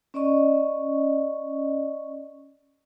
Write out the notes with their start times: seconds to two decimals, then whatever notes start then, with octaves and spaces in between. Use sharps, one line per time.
0.14 C#4 D5 D#5 C#6